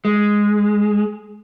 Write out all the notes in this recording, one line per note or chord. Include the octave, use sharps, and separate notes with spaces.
G#3